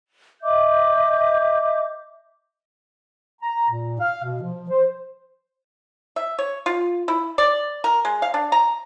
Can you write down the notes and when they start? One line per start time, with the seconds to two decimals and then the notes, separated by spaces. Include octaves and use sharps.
0.42 D#5 E5 D6 G6
3.42 A#5
3.70 A#2
4.00 F5
4.24 B2
4.42 F3
4.69 C5
6.16 E5
6.38 C#5
6.66 F4
7.08 E4
7.38 D5
7.84 A#4
8.05 G#3
8.22 F5
8.34 D4
8.52 A#5